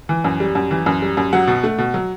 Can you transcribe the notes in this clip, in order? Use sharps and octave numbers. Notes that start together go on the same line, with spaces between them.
E3
F#2
G3
F#2
E3
F#2
G3
F#2
F#3 F#5
B2
A3
B2
F#3